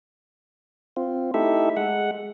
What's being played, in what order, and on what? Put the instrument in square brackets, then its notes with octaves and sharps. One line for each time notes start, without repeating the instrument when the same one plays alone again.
[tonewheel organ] C4 F4
A3 D#4 E4 G4 A4 E5
G#3 F#5